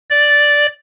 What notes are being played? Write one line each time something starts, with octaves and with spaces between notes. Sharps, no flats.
D5